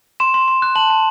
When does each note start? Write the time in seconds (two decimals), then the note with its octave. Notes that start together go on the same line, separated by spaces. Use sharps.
0.20 C6 E7
0.34 C6
0.48 C6
0.62 F#6
0.76 A5 F#7
0.90 A5